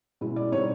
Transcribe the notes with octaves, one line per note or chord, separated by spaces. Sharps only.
B2 G#3 C#4 E4
D5
B2 G3 C4 D#4 C#5